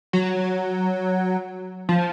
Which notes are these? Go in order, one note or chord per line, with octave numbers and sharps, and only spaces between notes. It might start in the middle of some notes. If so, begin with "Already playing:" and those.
F#3
F3